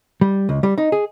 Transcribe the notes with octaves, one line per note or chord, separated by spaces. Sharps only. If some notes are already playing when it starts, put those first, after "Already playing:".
G3
C#2
G3
D#4
G#4